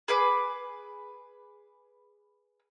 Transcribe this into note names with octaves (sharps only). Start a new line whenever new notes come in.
G#4 B4 D6